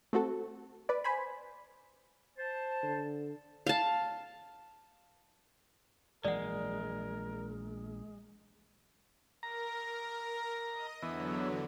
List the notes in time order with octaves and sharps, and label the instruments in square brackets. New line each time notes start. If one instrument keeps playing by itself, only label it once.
[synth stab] A3 C4 F#4 A4
B4 D5
C5 G#5 B5
[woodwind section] C5 A5
[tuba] D3
[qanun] F5 A5
[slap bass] A#1 E3 F#3 [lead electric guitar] G#3 [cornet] A#4 [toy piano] D5 F#5
[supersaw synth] A#4 [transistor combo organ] A#5
[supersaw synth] D#5 D#6
[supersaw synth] E2 D3 F#3 [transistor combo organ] E3 B3